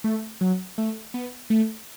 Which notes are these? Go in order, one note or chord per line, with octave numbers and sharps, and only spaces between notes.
A3
F#3
A3
B3
A3